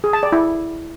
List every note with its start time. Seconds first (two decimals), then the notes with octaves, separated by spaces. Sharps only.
0.04 G#4
0.13 A5
0.23 D5
0.32 E4